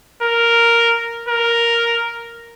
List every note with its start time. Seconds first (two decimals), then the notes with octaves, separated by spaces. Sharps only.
0.23 A#4
1.28 A#4